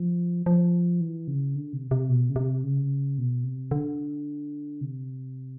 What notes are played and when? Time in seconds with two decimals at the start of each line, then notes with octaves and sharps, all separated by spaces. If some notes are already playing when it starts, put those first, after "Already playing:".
Already playing: F3
0.46 F3
1.01 E3
1.28 C#3
1.56 D3
1.73 C3
1.91 C3
2.09 B2
2.30 C#3
2.36 C3
2.64 C#3
3.18 B2
3.44 C3
3.71 D3
4.81 C3